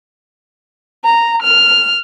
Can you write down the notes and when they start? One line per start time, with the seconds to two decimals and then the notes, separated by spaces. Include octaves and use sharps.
1.04 A#5
1.43 F6